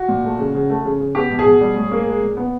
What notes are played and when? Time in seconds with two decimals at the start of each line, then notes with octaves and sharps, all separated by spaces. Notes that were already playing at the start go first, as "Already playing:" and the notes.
Already playing: F#4
0.08 A#2
0.24 A3
0.39 C#3
0.54 C#3
0.70 A3
0.85 C#3
1.00 C#3
1.15 B3 G4
1.30 B2
1.39 G#4
1.46 B2
1.61 G3
1.76 A2
1.91 A#3
2.07 G#3
2.22 A#2
2.37 B3